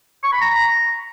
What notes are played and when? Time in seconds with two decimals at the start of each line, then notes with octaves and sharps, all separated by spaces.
0.23 C#6
0.32 B5
0.41 A#5